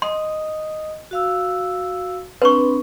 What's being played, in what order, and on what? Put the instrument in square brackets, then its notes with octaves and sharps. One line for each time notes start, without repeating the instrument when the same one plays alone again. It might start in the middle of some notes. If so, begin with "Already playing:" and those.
[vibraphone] D#5 D#6 [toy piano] C6
[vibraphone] F#4 F5 E6
[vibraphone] C4 D4 B5 [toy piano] B4 C#6